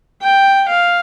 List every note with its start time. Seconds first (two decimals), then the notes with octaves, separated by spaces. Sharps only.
0.22 G5
0.68 F5